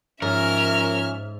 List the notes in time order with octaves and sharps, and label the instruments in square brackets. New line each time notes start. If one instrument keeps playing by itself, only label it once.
[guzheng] G#2 [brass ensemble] F3 C#4 [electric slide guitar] A#4 [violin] E5 F6